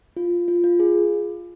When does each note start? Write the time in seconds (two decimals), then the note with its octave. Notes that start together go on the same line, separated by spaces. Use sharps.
0.17 F4
0.48 F4
0.64 F4
0.80 G#4